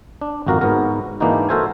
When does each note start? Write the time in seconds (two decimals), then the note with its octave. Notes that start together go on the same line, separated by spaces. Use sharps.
0.21 D4
0.47 G#1 F2 F#4 A#4 F5 A#5
0.61 G#2 B3 F#4 A#4
1.20 G#2 E3 A#3 D4 D#4 F#4
1.49 F#4 A4 A#4 C5 E5 G#5